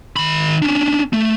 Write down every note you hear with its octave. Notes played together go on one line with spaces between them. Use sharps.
D#3 B5
C#4 D4
A3